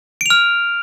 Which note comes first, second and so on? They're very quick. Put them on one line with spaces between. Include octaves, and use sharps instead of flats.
D7 F7 F6